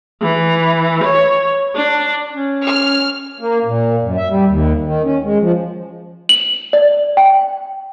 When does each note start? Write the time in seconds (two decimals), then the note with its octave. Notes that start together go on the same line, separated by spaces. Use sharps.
0.22 E3
1.04 C#5
1.75 D4
2.32 C#4
2.64 F6
3.40 A#3
3.65 A#2
4.03 F#2
4.17 E5
4.29 G3
4.46 D#2
4.84 D#3
5.04 C#4
5.24 G#3
5.41 F3
6.29 F#7
6.73 D5
7.17 G5